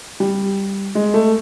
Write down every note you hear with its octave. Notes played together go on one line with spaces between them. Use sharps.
G3
G#3
A3